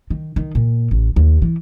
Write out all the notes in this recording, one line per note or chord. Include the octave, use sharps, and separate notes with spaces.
D#3
D#3
A#2
A1
D#2
E3